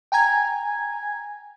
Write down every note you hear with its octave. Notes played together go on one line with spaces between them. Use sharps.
G5 G#5 A#5 G#6